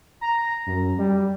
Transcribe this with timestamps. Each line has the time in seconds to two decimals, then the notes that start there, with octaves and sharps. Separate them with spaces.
0.21 A#5
0.66 F#2
0.98 G3